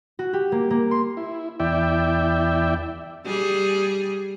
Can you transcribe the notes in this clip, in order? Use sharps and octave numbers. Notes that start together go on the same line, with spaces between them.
F#4
G4
A#3
A#3
C6
E4
E2 E4 D5 E5 G5
G3 G#4